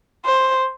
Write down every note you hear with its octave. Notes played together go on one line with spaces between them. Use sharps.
C5